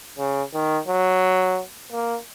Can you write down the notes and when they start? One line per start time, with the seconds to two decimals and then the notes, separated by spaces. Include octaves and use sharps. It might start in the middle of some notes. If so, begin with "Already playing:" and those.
0.18 C#3
0.54 D#3
0.88 F#3
1.92 A#3